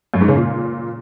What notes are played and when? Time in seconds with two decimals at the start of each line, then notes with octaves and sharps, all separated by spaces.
0.14 F#2
0.21 G#2
0.28 C#3
0.36 A#2